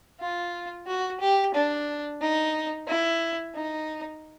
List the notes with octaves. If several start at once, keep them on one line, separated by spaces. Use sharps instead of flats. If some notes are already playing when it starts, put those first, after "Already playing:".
F4
F#4
G4
D4
D#4
E4
D#4